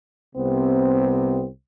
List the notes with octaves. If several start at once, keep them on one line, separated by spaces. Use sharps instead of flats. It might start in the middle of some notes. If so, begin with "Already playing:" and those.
C2 C3 B3 C4